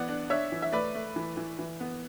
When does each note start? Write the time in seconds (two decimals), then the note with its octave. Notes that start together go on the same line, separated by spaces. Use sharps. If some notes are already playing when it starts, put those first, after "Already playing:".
Already playing: E3 B3 D5 F#5
0.08 D4
0.30 D4 C#5 E5
0.52 E3
0.62 E5
0.73 A3 B4 D5
0.95 A3
1.16 E3
1.37 E3
1.59 E3
1.80 B3